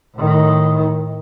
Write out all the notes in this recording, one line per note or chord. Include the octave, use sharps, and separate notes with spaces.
A2 D#3